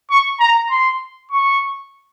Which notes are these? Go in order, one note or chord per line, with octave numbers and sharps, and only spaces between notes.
C#6
A#5
C6
C#6